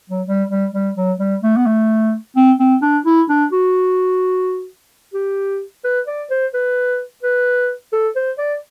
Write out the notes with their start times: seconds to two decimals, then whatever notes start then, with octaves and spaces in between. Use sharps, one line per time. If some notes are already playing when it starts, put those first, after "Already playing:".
0.10 F#3
0.28 G3
0.50 G3
0.74 G3
0.96 F#3
1.19 G3
1.43 A3
1.57 B3
1.66 A3
2.36 C4
2.60 C4
2.82 D4
3.06 E4
3.29 D4
3.52 F#4
5.14 G4
5.84 B4
6.07 D5
6.30 C5
6.54 B4
7.23 B4
7.93 A4
8.16 C5
8.38 D5